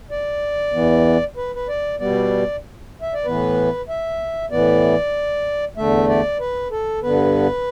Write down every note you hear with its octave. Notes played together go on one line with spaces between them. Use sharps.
D5
E2 E3 B3
B4
B4
D5
B2 G3 B3 D5
E5
D5
A2 E3 B3 B4
E5
A2 E3 B3 D5
E2 D3 A3 E5
D5
B4
A4
G2 D3 B3 B4